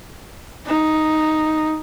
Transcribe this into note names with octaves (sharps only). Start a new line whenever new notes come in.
D#4